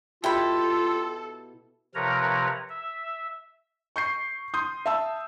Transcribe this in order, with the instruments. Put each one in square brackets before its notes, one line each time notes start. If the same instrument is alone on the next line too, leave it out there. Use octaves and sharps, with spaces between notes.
[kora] B2 E4 G4 [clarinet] F4 [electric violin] A4 [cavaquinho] G5 B5
[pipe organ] C3 F3 A#4 B4 C#5 A#5
E5
[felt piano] C#6 G6 C7
C6 D#6 G6
E5 A5 E6